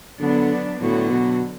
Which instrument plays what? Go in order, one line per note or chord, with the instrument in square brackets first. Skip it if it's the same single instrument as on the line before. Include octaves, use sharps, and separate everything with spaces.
[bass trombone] D3 [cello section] F#3 B3 D4
[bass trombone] A2 [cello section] D3 F#3 B3 F#4
[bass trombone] B2